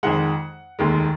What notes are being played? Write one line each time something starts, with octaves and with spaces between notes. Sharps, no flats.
F2 D#3 G#3 F#5
F1 D#2 D#3 G#3